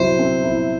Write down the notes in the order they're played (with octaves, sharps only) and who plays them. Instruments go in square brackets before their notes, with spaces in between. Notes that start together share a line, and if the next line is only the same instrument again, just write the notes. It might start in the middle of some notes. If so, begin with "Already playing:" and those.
Already playing: [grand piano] C3 F#3 C4 E4 [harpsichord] C5
[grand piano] C4
E4